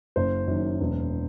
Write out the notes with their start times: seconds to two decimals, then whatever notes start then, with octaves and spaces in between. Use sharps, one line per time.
0.16 F#1 C5
0.47 F#2 D#3
0.80 E1